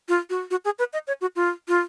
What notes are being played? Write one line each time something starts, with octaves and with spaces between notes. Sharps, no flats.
F4
F#4
F#4
G#4
B4
D#5
C#5
F#4
F4
F4